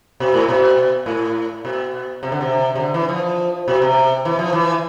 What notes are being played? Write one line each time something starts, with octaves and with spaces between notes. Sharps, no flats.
B2
A2
B2
A2
B2
C3
D3
C3
C3
D3
E3
F3
B2
C3
E3
F3
E3